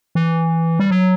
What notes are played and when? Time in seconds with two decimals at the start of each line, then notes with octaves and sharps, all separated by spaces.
0.15 E3
0.79 G3
0.91 F#3